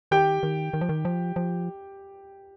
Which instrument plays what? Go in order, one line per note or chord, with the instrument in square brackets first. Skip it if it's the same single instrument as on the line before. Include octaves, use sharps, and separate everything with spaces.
[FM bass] D#3 [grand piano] G4 G5
[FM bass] D#3
D#3
F3
D#3
F3
F3